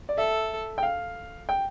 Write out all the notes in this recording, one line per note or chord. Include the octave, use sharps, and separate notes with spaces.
D5
A4 E5
G5
F5
G5